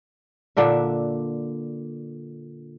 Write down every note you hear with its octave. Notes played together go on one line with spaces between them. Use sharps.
A#2 D3 D4 E5